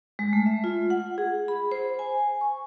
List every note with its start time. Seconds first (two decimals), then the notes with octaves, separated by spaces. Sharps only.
0.19 G#3
0.33 A3
0.46 E5
0.64 F4
0.90 F#5
1.18 G#4
1.48 B5
1.72 C5
1.99 G#5
2.41 C#6